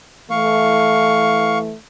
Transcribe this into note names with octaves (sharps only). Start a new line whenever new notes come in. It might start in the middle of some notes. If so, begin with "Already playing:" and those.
E3 A3 F5 C#6